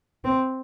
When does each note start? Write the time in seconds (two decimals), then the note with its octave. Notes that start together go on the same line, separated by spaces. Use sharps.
0.25 C4